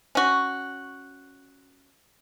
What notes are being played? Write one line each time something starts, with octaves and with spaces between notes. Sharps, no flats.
C#4 F#4